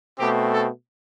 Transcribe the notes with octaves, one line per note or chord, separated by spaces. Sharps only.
B2 A3 C4 G4
A4